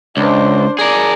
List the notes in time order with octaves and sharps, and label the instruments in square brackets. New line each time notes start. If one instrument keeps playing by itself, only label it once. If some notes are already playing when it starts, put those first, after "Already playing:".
[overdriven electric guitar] C#2 [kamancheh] D4 C5
[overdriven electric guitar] G#4 A#4 [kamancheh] D5